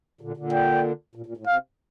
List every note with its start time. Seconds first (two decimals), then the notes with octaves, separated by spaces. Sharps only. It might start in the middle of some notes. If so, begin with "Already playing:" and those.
0.21 A#2 D3
0.37 A#2 D3
0.53 G5
1.15 A#2
1.26 A#2
1.37 A2
1.47 C3 F5